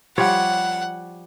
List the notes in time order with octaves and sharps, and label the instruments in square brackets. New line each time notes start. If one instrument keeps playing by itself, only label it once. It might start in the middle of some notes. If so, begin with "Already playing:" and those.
[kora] F3 G3 C#5 [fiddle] F#5